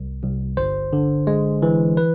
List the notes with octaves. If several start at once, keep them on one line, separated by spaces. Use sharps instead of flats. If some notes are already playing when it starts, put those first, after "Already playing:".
Already playing: C2
C2
G1 C5
D3
G#3
E3
B4